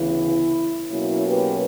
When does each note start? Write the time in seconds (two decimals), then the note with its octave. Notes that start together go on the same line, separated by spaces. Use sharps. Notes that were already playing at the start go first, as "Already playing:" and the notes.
Already playing: D2 C#3 E3 B3 E4
0.91 B2 F#3 A#3 C#4 E4
1.26 G4 B4